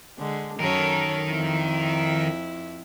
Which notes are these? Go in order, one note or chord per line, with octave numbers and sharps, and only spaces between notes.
D3 G#3
F#2 D#3 A4 A#4 C#5
F2 E4